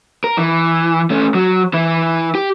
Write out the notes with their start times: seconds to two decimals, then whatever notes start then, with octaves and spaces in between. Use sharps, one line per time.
0.24 A#4
0.38 E3
1.10 A3 C#4
1.34 F#3
1.74 E3 E4
2.35 G4